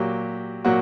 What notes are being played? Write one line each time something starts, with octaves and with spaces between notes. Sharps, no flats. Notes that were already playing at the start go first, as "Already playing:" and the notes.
Already playing: A#2 F#3 G4
A#2 F#3 F#4